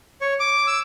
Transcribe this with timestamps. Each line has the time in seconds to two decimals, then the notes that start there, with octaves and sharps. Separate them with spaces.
0.21 C#5
0.40 D6
0.67 E6